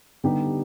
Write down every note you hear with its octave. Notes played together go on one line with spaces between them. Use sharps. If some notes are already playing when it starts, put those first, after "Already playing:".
D3 G3 B3 D#4 G4